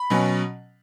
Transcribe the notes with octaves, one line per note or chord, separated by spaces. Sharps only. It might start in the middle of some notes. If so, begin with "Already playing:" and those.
Already playing: B5
B2 F#3 C#4